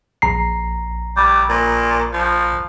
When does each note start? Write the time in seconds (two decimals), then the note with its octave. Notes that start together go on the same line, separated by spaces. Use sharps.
0.22 A#1 A#5 C7
1.17 G3
1.50 A#2
2.13 F3